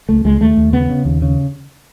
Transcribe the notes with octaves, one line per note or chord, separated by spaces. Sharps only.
C#2 A3
C#2 G#3
D#2 A3
D#2
C#3 B3
C#3
D#2
C#3